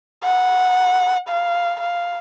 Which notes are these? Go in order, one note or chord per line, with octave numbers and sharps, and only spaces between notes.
F#5
F5
F5